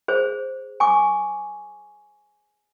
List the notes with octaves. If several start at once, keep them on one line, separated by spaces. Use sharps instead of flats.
G#4 C5 C#5
G#5 C#6 D6